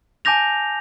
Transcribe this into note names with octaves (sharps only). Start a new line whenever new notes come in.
G#5 A5 D6 G6 A#6 F7